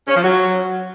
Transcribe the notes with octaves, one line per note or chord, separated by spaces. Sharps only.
C#4
F3
F#3